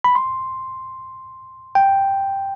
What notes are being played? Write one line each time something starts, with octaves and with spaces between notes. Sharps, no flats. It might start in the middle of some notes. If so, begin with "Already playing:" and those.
B5
C6
G5